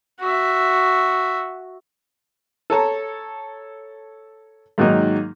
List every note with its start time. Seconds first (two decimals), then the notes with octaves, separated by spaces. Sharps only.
0.20 F#4 E5
2.70 A4 C#5 A5 A#5
4.78 G#2 D#3 F#3 A#3 D#4